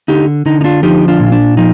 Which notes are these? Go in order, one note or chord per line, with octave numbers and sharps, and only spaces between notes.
D3 D#4 G4
D3 D#4
D#4
D4 F4
F3 D#4 G4
D4 F4
A#2
D4
F3 D#4